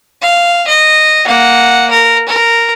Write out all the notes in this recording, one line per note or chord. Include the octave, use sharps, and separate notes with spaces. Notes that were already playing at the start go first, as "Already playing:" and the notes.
F5
D#5
A#3 F#5
A#4
A#4